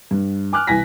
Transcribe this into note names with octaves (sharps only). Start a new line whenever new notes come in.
G2
G#5 D6 F6 F#6
C2 E3 G#5 A#6 B6